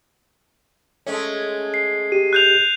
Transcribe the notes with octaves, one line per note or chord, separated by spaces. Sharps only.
G#3 A3 C#4
C7
G4 D#7
F#6 G6 F7